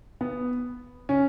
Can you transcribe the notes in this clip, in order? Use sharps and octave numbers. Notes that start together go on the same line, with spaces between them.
B3
C#4